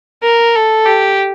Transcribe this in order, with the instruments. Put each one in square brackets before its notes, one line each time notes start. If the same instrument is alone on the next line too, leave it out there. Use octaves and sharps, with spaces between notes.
[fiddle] A#4
A4
G4